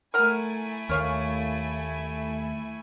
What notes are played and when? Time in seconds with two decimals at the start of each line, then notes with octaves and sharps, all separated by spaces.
0.14 A3 E4 A#4 F#5 G#5 A#5
0.89 D#2 A#3 C#5 F5